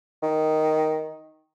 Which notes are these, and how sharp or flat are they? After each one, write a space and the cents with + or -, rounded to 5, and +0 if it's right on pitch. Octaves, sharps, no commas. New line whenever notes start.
D#3 +5